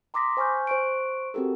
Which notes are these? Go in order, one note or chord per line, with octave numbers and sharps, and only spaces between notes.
A#5 C6 D6 D#6 A#6 B6
C5 G#5 C#6 F6 G6
C5 C#6 D7
C4 F#4 G4 A4 A#4